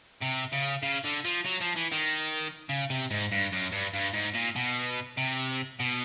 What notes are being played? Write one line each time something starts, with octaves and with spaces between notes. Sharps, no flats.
C3
C#3
C#3
D3
F3
F#3
F3
E3
D#3
C#3
C3
G#2
G2
F#2
G2
G2
G#2
A#2
B2
C3
B2